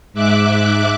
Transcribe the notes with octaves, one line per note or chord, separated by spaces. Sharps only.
G#2 E5 D6 F#6